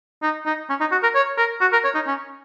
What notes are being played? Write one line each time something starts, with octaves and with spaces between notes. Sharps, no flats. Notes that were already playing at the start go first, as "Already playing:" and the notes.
D#4
D#4
C#4
D#4
F#4
A#4
C#5
A#4
F#4
A#4
C#5
D#4
C#4